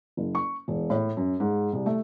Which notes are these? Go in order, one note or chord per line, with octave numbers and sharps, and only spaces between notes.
F#1
C#6
E1
A2
F#2
G#2
C2
A3